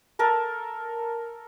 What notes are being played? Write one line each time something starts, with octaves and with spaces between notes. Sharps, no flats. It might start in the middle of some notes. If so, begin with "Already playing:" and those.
A4 A#4 A5